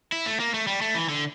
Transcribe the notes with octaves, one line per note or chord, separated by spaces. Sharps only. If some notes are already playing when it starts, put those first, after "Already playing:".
E4
A3
A#3
A3
G3
A3
E3
D3